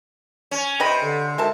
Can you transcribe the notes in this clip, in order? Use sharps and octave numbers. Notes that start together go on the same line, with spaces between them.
C#4
C3 B4 D#5 G5 B5
D3
D#3 G#3 F#4 A4 E5 A5